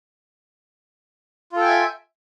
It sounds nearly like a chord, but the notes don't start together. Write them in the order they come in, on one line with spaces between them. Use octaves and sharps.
F4 A4 G5 G#5 E5